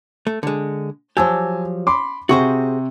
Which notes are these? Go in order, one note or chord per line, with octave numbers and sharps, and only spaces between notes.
A3
D3 G#3
F3 F#3 G4 G#5 A5 E6
B5 C6 D6
C3 F#4 G#4 C5 C#6